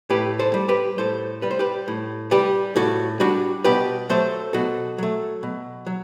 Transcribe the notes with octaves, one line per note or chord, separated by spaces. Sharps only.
A2 G4 B4
A4 C5
G3
G4 B4
A2 A4 C5
G3 B4
C5
G4 B4
A2
G3 G4 B4
A2 F#4 A4
G3 D4 F#4
B2 G4 B4
F#3 A3 A4 C5
B2 F#4 A4
F#3 A3
B2
F#3